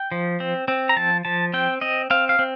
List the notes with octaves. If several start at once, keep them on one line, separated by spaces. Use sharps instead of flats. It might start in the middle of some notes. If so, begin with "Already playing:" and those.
Already playing: G5
F3
C4
C4
A#5
F3 A5
F3 A5
C4 G5
C4 D#5
C4 F5
F5
C4